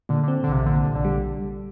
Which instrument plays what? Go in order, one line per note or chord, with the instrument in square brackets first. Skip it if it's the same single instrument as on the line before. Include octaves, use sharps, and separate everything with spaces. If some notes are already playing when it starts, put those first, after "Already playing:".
[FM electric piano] A#2 [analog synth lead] D3
[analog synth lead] D3 [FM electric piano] C4
[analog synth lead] D3
[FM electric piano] A#1 [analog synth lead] C3
[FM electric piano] A#2 [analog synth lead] D3
[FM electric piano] A#1
[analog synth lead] D3
[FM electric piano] G3